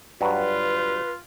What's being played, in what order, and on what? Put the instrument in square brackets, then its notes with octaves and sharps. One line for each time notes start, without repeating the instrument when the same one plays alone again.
[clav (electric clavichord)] G2 F#3 [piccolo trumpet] F4 [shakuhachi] B4